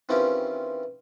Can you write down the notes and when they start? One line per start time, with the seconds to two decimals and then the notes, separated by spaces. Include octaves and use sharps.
0.09 D#3 E3 C4 C#4 F4 G4